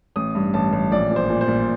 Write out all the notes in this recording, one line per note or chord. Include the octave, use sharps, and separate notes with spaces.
A1 D#6
G2
A1 A5
A1
A#1 D5
A#2
C5
A#2
C5
A#2